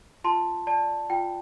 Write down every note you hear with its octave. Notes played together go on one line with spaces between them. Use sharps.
F4 A5 C6
D5 A5
F4 G5